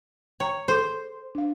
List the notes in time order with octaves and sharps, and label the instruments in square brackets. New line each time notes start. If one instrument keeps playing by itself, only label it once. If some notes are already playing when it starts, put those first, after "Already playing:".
[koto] C#5 [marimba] G5 A#5
[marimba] G#4 A4 D6 [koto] C5
[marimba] D4 F5